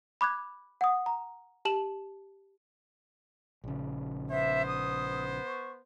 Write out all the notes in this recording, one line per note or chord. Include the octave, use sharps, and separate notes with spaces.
B5 D6 F#6 G#6
F#5 D#6
A#5
G4 A5 E7 F#7
A#1 C#3
B3 C5 E5
D#6
C#6